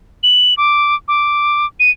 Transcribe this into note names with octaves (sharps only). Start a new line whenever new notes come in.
F#7
D6
D6
D#7